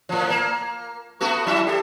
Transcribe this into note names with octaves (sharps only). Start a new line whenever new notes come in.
A2 F3
A#3
A3 B3 F#4
F#3 E4 E5
G4 A4